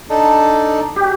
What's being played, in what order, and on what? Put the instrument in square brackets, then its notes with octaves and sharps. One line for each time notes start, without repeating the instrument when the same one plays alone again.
[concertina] D4 D#4 A4
[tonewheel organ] G4